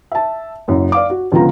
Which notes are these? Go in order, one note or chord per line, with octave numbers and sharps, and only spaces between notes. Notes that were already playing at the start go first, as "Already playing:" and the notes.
E5 A5
F#1 F#2
D5 F5 D6
F#4
C#2 D3 F3 B3 F4 A#5